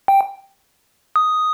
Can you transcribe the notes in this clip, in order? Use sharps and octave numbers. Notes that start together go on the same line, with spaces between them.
G5
D#6